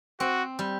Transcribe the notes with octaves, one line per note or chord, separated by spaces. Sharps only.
C4 F#4
G3